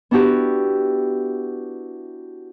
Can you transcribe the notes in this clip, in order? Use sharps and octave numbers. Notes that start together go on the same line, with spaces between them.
B3 D4 E4 F#4 G4